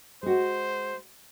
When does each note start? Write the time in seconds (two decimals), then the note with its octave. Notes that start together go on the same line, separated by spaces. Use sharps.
0.23 G#3 F#4 C5